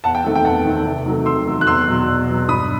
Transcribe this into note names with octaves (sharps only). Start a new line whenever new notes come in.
E2 F#5 A5
G5
D#3 A3 C4
G5
E2 F#5 A5
D#3 A3 C4
C3
D#3 F#3 A3
C3 C6 E6
D#3 F#3 A3
F#6
E2 C6 E6
B2 F#3
E2
B2 F#3
G2 B5 D#6